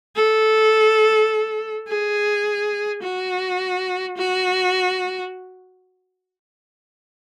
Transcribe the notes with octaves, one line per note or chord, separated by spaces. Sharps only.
A4
G#4
F#4
F#4